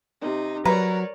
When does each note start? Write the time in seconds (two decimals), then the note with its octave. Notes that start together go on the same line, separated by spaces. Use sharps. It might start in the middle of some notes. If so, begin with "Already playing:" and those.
0.20 C3 D#4
0.65 F#3 A#4 B4 C#5 D5 A#5